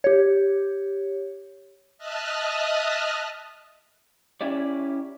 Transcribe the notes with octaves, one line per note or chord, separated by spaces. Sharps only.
G4 C#5
D#5 E5 A5 D#6 F6 F#6
C#4 E4 G4 D5